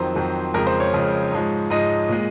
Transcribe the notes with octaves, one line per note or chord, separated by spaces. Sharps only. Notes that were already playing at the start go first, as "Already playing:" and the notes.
Already playing: F2 D#3 F#3 C5
F2 D#3 F#3
F2 C#3 G#3 A#4
C5
C#5
F2 C#3 G#3
G#2 F3 G#3
G#2 F3 G#3 D#5
A#2 G#3